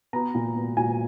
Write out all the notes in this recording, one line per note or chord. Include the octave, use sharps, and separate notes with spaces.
B3 A#5
A#2
B3
A#2 G#5